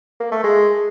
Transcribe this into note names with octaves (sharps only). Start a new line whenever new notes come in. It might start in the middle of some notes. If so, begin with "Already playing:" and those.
A#3
A3
G#3